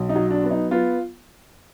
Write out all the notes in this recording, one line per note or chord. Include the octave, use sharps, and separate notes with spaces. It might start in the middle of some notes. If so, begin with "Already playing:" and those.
Already playing: B1
D#4
F#3
D4
B3
D#4
B3 F4